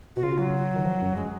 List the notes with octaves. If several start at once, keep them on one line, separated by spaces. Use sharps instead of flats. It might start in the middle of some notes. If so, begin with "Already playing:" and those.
B2 F#4
C#3 F4
F#3
D#3
F3
F#2
G#3